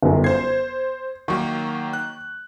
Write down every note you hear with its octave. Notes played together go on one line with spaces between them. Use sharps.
G1 F#2
C5 G#6 C7
D#3 F#3 A#3 C#6
F#6